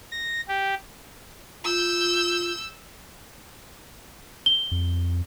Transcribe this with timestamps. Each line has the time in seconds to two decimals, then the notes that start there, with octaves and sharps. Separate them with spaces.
0.12 A#6
0.48 G4
1.64 F4 E6 G6
4.46 G7
4.71 F2